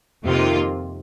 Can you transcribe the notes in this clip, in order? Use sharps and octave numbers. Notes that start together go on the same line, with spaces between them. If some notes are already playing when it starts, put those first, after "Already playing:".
F2 C3 D#3 A#3 F4